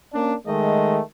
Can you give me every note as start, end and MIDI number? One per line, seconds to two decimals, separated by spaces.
0.13 0.34 58
0.13 0.34 61
0.13 0.34 62
0.47 1.00 51
0.47 1.00 56
0.47 1.00 57
0.47 1.00 75